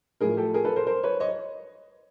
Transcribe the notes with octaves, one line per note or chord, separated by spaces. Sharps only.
A2 F3 G#4 A#4
G4 A4
G#4 A#4
A4 B4
A#4 C5
A#4 C5
B4 C#5
C#5 D#5